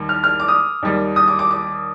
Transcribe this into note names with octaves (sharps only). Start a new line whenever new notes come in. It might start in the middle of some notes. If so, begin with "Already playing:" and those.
Already playing: D#2 D#3 G3
F6
F6
D6
D#6
D#2 D#3 G3
D#6
D6
D6
D6